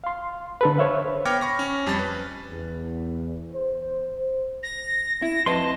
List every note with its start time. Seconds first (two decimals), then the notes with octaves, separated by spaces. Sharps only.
0.04 F5 C6
0.61 D3 A4 B4
0.78 C5 C#5 E5 F5
1.25 B3 C#5 G5 D6 F6 A#6
1.41 B5 C#6 A#6
1.59 C#4
1.86 F2 G3 A5 B5 A6
1.99 B4
2.50 E2
3.53 C5
4.63 A#6
5.22 E4 A#6
5.46 F2 B4 D#5 A5 C6